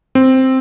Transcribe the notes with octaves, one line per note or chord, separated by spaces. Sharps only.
C4